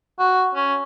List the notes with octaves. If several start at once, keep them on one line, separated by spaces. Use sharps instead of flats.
F#4
C#4